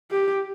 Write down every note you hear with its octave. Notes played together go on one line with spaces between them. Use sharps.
G4